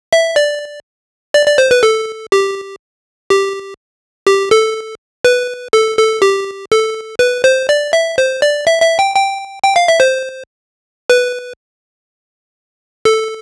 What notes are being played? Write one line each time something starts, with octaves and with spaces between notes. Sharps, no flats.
E5
D5
D5
D5
C5
B4
A4
G4
G4
G4
A4
B4
A4
A4
G4
A4
B4
C5
D5
E5
C5
D5
E5
E5
G5
G5
G5
F5
E5
C5
B4
A4